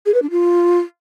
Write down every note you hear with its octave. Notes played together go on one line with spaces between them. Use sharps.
G#4
B4
D4
F4